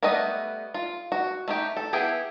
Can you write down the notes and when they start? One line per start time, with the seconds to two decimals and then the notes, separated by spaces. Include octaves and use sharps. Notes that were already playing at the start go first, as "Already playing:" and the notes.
0.03 G3 A3 B3 B4 D#5
0.74 F4
1.12 F#4
1.48 A3 D#4 G4
1.77 A4
1.93 B3 E4 G4 G#4